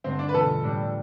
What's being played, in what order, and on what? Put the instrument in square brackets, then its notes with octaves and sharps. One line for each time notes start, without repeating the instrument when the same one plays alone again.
[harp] G2 D3 A3 [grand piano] C4
[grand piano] D4
B4
[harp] E2 B2 B3 F4 [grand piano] A4
[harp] A2 G3 D4